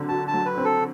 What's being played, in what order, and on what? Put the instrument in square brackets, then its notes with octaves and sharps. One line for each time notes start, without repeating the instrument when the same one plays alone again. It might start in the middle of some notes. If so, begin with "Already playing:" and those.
Already playing: [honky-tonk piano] D3 F#3 C4
[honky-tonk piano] F#4 [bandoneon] A5
[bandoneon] A5
[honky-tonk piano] F#3
[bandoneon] B4
[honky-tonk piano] C4
[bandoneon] A4